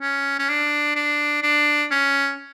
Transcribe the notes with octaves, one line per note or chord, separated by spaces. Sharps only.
C#4
C#4
D4
D4
D4
C#4